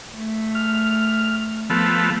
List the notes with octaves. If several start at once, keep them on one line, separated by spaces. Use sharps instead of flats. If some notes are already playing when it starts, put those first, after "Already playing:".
A3
F6
F3 A3 B3